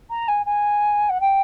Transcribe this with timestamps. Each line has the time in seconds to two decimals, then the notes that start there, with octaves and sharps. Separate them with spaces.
0.10 A#5
0.28 G#5
0.46 G#5
1.09 F#5
1.21 G5